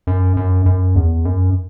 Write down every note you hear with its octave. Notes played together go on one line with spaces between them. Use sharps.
F#2
F#2
F#2
E2
F#2